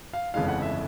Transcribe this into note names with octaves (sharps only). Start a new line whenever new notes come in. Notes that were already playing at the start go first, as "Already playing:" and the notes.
F5
G1 F2 C#3 E3 G#3 F5
F#5
E5